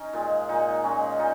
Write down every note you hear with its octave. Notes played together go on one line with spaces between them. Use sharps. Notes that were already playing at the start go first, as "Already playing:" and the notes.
Already playing: C#4 D#4
A#2 G#3
A#2 G#3 D#4
A#2 G#3 C#4
A#2 D#4